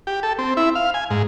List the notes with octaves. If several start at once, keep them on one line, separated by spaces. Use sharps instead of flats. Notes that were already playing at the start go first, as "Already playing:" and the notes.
G4
A4
C4
E4
F5
G#5
G#2